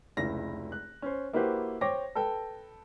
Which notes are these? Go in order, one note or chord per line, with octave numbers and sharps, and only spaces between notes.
F1 C#2 E4 A#6
F#6
C#4 C5
A#3 E4 F#4 G4 B4 C5
C5 C#5 G5 D6 A#6
A4 B4 G5 A5